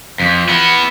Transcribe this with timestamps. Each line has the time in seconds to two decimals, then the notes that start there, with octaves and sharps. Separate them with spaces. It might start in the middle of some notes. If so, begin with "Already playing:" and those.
0.20 F2
0.49 B3 E4